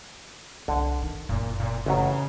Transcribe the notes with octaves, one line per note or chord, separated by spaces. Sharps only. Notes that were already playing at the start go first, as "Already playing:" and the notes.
C2 D3
D#3
F#1 A#2
A#2
A1 C#3 F#3